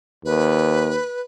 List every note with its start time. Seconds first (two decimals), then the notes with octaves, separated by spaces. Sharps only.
0.25 D#2 B4